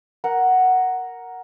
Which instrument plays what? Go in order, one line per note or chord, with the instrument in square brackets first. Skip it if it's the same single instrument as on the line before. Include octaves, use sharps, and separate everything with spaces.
[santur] A#4 F#5